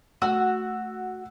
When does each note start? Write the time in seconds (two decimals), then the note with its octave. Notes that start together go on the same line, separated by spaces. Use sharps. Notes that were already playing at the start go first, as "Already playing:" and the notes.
0.22 A3 F#4 F#5 E6